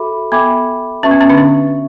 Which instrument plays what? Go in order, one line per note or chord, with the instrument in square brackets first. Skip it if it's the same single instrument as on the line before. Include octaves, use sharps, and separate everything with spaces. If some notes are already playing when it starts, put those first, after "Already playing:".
Already playing: [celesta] F#4 A4 E5 B5 D6
[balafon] B3 [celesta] A4 E5 G5 B5 D6
[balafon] C#4 [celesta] F#4 B4 E5 A5 C#6
[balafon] B3
C#4
D3 D4
C#4